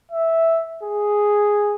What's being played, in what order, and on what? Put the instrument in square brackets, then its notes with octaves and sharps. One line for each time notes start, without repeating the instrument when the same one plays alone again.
[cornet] E5
G#4